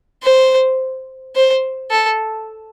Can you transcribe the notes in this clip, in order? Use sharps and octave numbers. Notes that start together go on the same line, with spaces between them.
C5
C5
A4